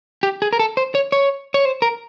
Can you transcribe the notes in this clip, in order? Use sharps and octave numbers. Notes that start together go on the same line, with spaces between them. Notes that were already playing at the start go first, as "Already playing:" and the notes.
G4
G#4
A#4
A4
C5
C#5
C#5
C#5
C5
A#4